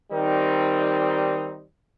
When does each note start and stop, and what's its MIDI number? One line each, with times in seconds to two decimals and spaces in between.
0.12 1.63 51
0.12 1.63 55
0.12 1.63 60
0.12 1.63 63